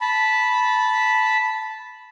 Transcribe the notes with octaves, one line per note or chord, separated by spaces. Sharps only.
A5 B5